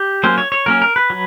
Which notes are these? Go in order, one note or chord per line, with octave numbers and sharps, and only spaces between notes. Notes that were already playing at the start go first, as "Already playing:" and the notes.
Already playing: G4
F#3 A#3 C#4 C5
C#5
C#5
F#3 A#3 C#4 A#4
A#4
B4
F#3